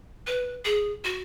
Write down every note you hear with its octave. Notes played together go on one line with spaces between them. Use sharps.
B4
G#4
F#4